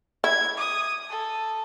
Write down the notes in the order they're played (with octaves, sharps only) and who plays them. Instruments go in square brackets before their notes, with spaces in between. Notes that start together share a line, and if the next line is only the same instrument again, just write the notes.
[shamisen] E4 [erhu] G#6
[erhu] D#6
A4